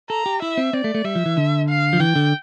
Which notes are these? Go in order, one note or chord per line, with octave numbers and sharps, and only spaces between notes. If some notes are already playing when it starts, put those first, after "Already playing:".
A4 A#5
G4
E4 E5
C4
C4 D5
A3
A3
G3 E5
F3
E3
D3
F5
F3
E3 G5
D3